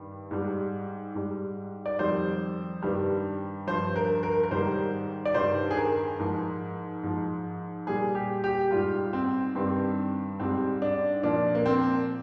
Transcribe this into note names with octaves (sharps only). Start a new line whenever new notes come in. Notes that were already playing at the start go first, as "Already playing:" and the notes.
Already playing: G2 D#3 G3
G#2 G3
G#2 G3
D5
F2 D#3 G3 C5
G2 D#3 G3
G2 F3 C5
A#4
A#4
A#4
G#2 D#3 G3 C5
D5
G2 D#3 G3 C5
G#4
A#4
G#2 F3
G#2 F3
A#2 G3 G#4
G4
G4
G#2 G3 F4
C4
G2 D#3 G3 C4
G#2 G3 C4
D4
A#2 F3 D4
A#3
C4